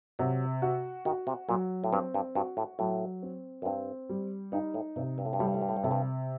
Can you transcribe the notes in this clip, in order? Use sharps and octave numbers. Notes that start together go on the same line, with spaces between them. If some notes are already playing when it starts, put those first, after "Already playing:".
C3 F#3
F#4
D#3 F#4
C3
A#2 F#3
A2
G2 C4
G2
G2 F#4
A2
A2 F#3
C4
F#2
G2 C4
G3
G2 D#4
A2
G2 C3
G2
A2
G2
A2 G3
G2
A2
G2
A2
G2
A2 C3
G2